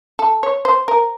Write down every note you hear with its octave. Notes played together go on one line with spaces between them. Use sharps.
A4
C#5
C5
A#4